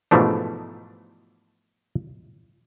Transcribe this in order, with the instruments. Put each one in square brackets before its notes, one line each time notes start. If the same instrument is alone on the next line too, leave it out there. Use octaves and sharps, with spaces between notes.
[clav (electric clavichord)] G#2 B2 E3 F3 A3 D4